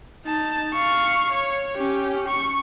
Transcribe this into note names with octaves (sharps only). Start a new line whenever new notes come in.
D#4 A5
F5 C#6
C#5
C#4 G4
C#6